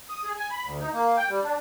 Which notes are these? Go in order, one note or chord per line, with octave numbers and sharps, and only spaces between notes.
D#6
G#4
G#5
B5
D2
D#4
A#3
G5
G3
D4